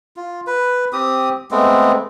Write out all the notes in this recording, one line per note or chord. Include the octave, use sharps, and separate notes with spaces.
F4
B4
C4 G4 D#6
G#3 A3 B3 C4